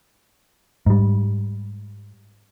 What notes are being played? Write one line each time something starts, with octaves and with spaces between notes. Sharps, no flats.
G#2 G3